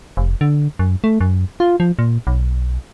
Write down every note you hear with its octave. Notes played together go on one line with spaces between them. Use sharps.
F1
D3
F#2
A3
F#2
F4
F3
A#2
B1